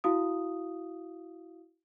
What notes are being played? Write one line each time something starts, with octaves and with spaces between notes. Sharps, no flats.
E4 F#4 F5 D#6